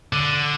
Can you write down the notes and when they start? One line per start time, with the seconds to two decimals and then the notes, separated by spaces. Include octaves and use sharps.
0.13 D3